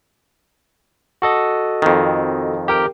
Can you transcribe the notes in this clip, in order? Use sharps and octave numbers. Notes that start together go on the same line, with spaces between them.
F#4 A4 D#5
F2 D#3
G4 A#4 G5